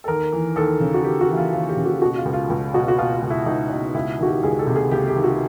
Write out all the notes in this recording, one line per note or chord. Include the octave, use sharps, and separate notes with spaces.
A4
D#2 A#4
E3
D#2 A4
C#3
F#4
D#2 G4
F#4
E3 E4
F4
D#2 F4
G4
C#3
F#4
B2 F#4
F4
C#2
F4
C#2
B2 F#4
F#4
B2 F4
F4
C#2
E4
C#2 D#4
B2
C#2 E4
D#3 F#4
G4
C#2 G#4
A4
C3
G#4
C#2 G4
G4
D#3
F#4